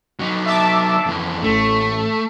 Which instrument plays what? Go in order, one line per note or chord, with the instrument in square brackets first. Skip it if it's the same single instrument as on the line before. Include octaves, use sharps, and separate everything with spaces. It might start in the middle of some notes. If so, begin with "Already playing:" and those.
[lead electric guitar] F#3 D#4
[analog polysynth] E5 A5 D6
[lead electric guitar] F2 E3
[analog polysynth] A1 [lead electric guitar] A3